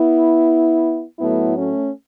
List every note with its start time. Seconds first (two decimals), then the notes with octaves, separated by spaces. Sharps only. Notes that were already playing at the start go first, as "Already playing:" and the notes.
Already playing: B3 E4
1.19 A2 F#3 A3 B3 E4
1.57 A3 C#4